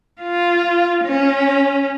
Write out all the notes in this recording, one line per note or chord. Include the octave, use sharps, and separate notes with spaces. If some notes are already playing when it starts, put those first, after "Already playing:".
F4
C#4